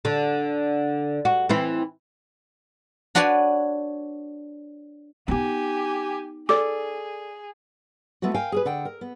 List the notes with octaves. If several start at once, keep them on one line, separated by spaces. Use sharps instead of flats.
D3
F#4
E3 C4 E4
D4 F#4 B4 C#5 D5 G#5
B3 D#4 G4 G#5
G#4 A4 D5 D6
G#3 A3 B3 E4 F#4
A#4 F5 G5 G#5
G#4 A#4 B4
D3 F#5 G5
A#4
B3